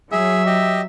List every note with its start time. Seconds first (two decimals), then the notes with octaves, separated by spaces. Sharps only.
0.12 F#3 G#4 E5
0.46 G4 D#5